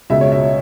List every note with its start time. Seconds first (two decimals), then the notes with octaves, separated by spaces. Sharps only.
0.10 C#2 B2 E5
0.21 C#5
0.32 E5